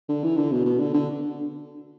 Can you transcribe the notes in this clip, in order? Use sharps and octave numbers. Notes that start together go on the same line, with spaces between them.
D3
E3
D3
B2
B2
D3
D3